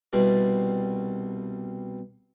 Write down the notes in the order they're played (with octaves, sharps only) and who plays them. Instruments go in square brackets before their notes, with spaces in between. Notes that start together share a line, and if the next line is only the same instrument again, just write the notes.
[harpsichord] C2 B2 G3 C4 D5